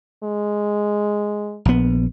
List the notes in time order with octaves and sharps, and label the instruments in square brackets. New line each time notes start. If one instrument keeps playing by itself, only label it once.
[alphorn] G#3
[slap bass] A#1 B3